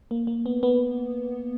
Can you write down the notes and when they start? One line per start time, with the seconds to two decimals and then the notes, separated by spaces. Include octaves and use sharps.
0.11 A#3
0.27 A#3
0.46 B3
0.63 B3